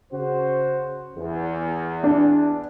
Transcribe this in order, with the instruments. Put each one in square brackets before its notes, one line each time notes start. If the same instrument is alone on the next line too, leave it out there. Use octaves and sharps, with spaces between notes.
[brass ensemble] C#3 F#4 C5
E2
[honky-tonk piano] D4